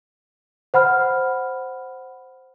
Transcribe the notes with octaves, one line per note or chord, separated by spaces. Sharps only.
C5 F#5 B5 F6